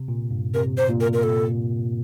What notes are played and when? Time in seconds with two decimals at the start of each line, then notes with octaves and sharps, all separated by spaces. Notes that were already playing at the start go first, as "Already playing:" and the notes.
Already playing: C3
0.08 A#2
0.31 G2
0.54 C3 A#4
0.77 C5
0.89 A#2
1.01 A#4
1.13 A#4
1.23 A4